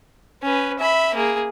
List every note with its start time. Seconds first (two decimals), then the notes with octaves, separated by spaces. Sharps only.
0.43 C#4 B4
0.79 E5 B5
1.14 A#3 G#4